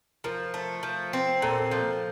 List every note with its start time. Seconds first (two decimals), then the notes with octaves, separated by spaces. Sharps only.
0.24 F3 A#4
0.54 A3
0.83 F3
1.13 C4
1.42 A#2 A4
1.50 A#4
1.59 A4
1.71 F3 A4